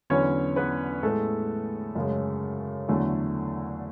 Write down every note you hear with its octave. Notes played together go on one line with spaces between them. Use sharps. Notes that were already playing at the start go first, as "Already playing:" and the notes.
E2 D3 F#3 B3 C#4 C#5
B3 B4
A2 G#3 A3 B3 A4
F#2 C#3 G#3
E2 D3 F#3 A3